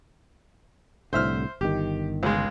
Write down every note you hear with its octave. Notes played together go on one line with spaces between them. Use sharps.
C2 A2 D3 C5 E5 F6
G1 D#3 G4
C#2 G#3